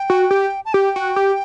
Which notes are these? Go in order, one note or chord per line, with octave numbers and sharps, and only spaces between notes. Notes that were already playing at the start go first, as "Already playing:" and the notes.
Already playing: G5
F#4
G4
A5
G4 G5
F#4
G4